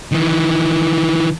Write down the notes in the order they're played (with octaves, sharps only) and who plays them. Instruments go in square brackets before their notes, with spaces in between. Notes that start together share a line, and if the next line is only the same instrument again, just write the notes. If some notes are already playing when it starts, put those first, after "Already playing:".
[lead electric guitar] D#3 E3